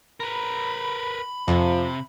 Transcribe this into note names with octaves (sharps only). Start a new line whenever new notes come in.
A#4 B4 B5
F2 C3 F3